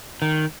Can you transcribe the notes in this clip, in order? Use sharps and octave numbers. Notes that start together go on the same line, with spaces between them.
D#3